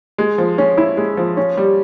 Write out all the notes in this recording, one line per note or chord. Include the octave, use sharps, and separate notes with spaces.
G#3
F3
C#4
E4
G#3
F3
C#4
G3